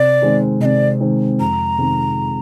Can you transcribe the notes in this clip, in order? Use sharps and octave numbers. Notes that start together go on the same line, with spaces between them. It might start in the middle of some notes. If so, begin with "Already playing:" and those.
Already playing: C3 D5
D#3 G#3 C4
C3 D5 D#5
D#3 G#3 C4
F2 A#5
C3 D#3 G#3